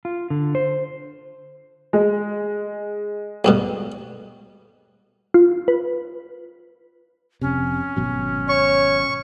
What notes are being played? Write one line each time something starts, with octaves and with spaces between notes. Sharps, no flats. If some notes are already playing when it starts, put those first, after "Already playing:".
F4
D3
C5
G#3
D2 G2 B2
F4
B4
F1 C3 C#4
G#1 B2 F#3
C#5 C#6